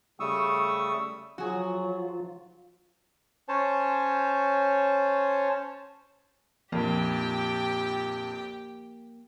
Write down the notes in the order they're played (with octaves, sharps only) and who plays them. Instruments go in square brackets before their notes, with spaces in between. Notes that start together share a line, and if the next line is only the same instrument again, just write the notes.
[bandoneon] C#3 G3 A3 C#6 D#6 E6
[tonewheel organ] F3 F4 [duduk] F#3 [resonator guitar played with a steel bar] F#4 G#4
[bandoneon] C#4 C5 C#5 A5
[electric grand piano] A#1 F2 [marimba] F3 [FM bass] A#3 [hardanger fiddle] G4 G5